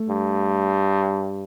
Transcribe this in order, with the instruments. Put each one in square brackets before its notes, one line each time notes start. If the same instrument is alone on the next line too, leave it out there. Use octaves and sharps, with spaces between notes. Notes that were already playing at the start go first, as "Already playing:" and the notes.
Already playing: [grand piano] A3
[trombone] G2